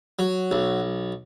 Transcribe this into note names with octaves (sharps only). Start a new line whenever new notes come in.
F#3
B1